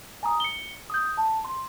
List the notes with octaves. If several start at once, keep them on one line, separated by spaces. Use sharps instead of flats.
G#5 A#5 D#6
C#7 G7
D#6 G6
A5
C6